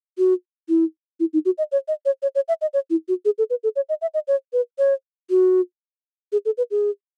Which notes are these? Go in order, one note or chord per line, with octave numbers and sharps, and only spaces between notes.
F#4
E4
E4
D#4
F#4
D#5
C#5
D#5
C#5
C#5
C#5
E5
D#5
C#5
E4
F#4
G#4
A4
B4
A4
C#5
D#5
E5
D#5
C#5
B4
C#5
F#4
G#4
A4
B4
G#4